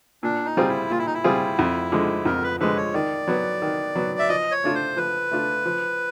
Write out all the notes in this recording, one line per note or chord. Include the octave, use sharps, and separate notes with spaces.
A#2 D4
D#4
G3 C4 F4 G#4
E4
A#2 F4
E4
D#4
E4
G3 C4 F4 G#4
F2
D3 F3 G#3
F2 A#4
B4
D3 F3 G#3 B4
C#5
D#3 D5
F#3 B3
D#3
F#3 B3
E5
F3 D#5
C#5
A3 D4 F4
C5
F3 B4
A3 D4 F4
F3